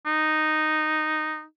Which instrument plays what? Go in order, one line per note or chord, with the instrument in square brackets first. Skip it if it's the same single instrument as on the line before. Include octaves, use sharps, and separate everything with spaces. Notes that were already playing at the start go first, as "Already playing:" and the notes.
[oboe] D#4